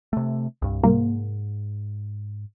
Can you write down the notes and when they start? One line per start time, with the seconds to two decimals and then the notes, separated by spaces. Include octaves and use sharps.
0.13 C3 A3
0.62 C2 G2
0.83 C2 G#2 A#3